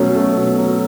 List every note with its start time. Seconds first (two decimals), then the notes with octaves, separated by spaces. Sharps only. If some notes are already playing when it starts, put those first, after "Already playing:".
Already playing: B2 F#3 A3 C#4
0.15 A3
0.37 B2
0.58 F#3